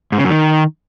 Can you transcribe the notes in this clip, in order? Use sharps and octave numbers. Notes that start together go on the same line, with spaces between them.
G#2
C#3
F#2
D#3